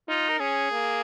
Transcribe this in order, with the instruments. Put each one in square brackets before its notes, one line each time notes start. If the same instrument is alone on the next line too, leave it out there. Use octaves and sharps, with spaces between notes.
[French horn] D#4 [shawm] F4
[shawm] A#4
[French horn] C#4 [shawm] G#4
[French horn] A#3